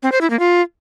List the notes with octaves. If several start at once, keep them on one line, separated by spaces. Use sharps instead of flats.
C4
C5
E4
A#3
F4